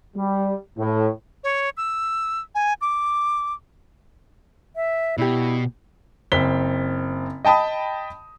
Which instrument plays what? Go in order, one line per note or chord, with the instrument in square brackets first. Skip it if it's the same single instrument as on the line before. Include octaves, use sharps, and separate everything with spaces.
[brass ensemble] G3
A2
[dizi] C#5
E6
G#5
D6
[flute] E5
[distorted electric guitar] B2 [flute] E4 [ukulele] G4 D5
[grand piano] F#1 C4 B6 G7
D#5 G5 A5 B5 D#6